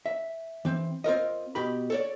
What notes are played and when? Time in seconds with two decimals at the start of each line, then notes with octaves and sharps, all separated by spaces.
0.06 E5
0.65 E3 C4
1.04 C4 F4 A#4 D#5
1.55 B2 G4 B5
1.90 A4 C#5 D5